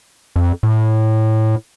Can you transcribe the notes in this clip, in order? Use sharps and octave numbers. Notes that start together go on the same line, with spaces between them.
F2
A2